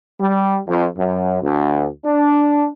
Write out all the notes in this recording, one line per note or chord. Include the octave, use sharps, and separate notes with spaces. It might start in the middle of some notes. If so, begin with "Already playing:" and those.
G3
F2
F#2
D2
D4